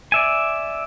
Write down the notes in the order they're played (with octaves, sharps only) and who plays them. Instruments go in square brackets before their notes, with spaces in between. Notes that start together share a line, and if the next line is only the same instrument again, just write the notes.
[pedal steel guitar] D5 E5 G#5